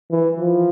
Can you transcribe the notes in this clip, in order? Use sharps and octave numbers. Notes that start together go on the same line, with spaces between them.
E3
F3